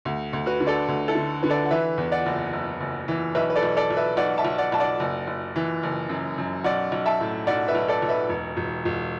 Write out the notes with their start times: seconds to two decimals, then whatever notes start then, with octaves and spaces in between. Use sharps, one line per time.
0.05 D2
0.33 D2
0.46 F#4 B4
0.60 D3
0.67 A4 D5
0.88 D2
1.08 E4 A4
1.15 D3
1.43 D3 B4
1.50 A4 D5
1.66 F#5
1.71 E3 B4 E5
1.98 E2
2.12 D5 F#5
2.26 F#1
2.53 F#1
2.80 F#1
3.08 E3
3.35 B1 B4 E5
3.50 B4
3.56 A4 D5
3.63 B1
3.77 A4 D5
3.90 B1
3.97 B4 E5
4.17 B1 D5 F#5
4.38 E5 A5
4.45 B1
4.58 D5 F#5
4.72 B1 A5
4.80 D5 F#5
5.00 F#1
5.27 F#1
5.56 E3
5.83 F#1
6.09 F#2
6.38 F#2
6.64 B1 D5 F#5
6.92 B1
7.06 E5 A5
7.20 A2
7.47 B1 D5 F#5
7.68 B4 E5
7.75 B1
7.88 A4 D5
8.02 B1
8.09 B4 E5
8.29 E1
8.57 E1
8.85 E1